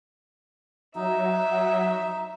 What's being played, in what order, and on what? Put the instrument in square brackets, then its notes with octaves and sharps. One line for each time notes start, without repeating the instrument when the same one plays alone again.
[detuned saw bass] F#3 [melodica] D#4 [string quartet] E5